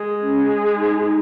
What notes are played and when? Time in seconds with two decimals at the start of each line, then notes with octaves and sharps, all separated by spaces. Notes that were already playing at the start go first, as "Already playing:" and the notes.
Already playing: G#3
0.20 C#4
0.76 D#4
0.98 F#4
1.04 D#4